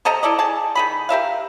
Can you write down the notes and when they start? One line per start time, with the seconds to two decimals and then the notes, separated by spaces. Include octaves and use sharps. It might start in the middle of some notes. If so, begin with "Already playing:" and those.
0.05 C3 A4 D#5 A#5
0.23 E4 A4 D5 D#5
0.39 G#4 A5
0.75 D#3 G#4 B5
1.09 G4 A#4 E5 F5